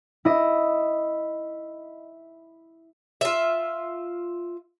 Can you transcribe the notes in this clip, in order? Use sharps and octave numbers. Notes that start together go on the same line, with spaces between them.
E4 D#5
F4 E5